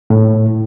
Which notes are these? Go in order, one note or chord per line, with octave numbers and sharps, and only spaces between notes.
A2